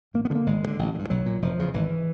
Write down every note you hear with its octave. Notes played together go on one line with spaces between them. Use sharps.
A1 A#3
B3
G2 D3
A#3
G#1 G#3
G2
D3
A1
D3
G2
B1 F#3
A#2
F1 F3
E2 C#3
G#1 E3